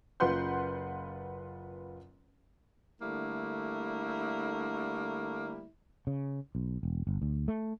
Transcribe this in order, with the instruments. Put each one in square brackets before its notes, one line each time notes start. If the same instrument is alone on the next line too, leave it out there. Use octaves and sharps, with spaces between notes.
[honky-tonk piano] F#1 F4 B4 F#5 C6 G6
[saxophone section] D3 G3 A3 A#3 E4
[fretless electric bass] C#3
B1
E1
G1
D2
A3